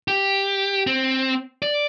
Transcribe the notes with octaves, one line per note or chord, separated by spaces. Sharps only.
G4
C4
D5